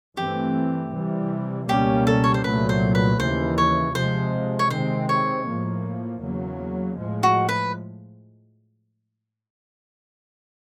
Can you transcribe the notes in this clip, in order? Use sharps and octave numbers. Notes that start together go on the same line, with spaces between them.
G2 E3 A3 C4 G4
C3 E3 G3
C#2 B2 G3 A#3 C#4 G4
A4
C#5
C5
C2 A#2 F#3 A3 B4
C5
B4
D#2 C#3 E3 C5
C#5
C3 F3 G#3 C5
C#5
C3 D#3 G#3 C4 C5
C#5
A2 F3 A#3
E2 C#3 F#3 A#3
A2 F3 G#3
F#4
B4